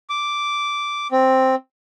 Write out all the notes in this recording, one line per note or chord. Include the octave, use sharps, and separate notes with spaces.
D6
C4